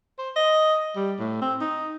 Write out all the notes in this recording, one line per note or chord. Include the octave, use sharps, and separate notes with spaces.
C5
D#5
G3
A2
C4
D#4